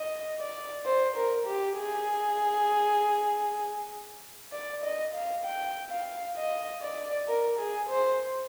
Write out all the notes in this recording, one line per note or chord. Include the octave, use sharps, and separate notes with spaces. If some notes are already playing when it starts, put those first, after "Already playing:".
Already playing: D#5
D5
C5
A#4
G4
G#4
D5
D#5
F5
G5
F5
D#5
D5
A#4
G#4
C5